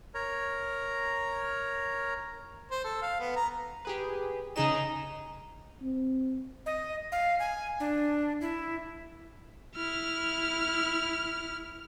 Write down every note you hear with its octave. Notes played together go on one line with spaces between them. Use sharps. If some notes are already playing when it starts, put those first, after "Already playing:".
A#4 C#5 A#5
C5
A4
F5
B3
A#5
G4 G#4 B4
C#3 D#4 G#4 E7
C4
D#5
F5
G#5
D4
E4
E4 F6